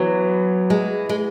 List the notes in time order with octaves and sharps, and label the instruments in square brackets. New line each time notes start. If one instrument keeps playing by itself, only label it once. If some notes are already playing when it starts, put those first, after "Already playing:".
Already playing: [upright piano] E3 B3 [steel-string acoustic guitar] F#3
[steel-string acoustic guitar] G#3
G#3